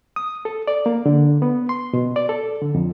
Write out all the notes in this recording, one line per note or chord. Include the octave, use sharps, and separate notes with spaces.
D#6
A4
D5
A#3
D3
B3
C6
B2
D5
A4
D3
F2